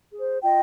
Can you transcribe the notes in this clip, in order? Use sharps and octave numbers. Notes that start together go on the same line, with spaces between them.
G#4
C5
F4 D#5 G5